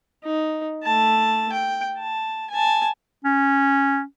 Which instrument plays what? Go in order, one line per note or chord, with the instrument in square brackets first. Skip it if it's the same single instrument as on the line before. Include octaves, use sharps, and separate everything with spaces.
[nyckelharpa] D#4
A3 A5
G5
A5
G#5 A5
[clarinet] C#4